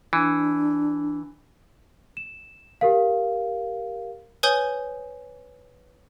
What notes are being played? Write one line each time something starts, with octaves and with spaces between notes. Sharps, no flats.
E3 D4
E7
G4 A#4 F5
B4 C#5 G#5 D#6 G6 G7